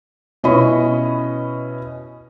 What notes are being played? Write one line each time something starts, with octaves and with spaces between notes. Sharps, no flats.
B2 C#4 E4 D#5 B5 C#6